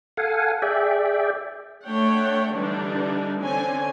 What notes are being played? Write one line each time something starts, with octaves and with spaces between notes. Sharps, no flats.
A4 F5 F#5 G#5
G#4 D5 E5 G5
A3 D4 C#5 F#5 G5
D3 E3 G3 D4 D#4
D3 C4 C#4 G#5